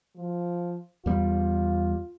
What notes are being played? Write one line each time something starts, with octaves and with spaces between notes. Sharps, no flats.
F3
E2 G3 F4